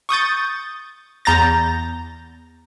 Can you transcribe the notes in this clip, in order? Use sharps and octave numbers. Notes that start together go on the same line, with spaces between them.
C#6 D#6 G6 A6
E2 A#5 G6 A6 A#6